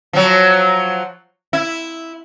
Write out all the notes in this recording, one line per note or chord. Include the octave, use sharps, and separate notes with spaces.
F3 F#3
E4